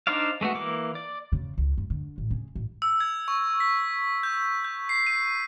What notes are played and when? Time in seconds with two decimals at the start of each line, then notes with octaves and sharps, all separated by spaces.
0.07 D4 D#4 C5 D5 F5
0.41 G#3 A3 B3 F#4
0.55 E3 A#3 D6
0.95 D5
1.32 C#3
1.58 C#2
1.77 G2
1.90 D3
2.18 A1
2.30 C#3
2.56 A1
2.82 E6
3.00 G#6
3.28 C#6
3.60 B6
4.23 G6
4.64 G6
4.89 C7
5.07 D#7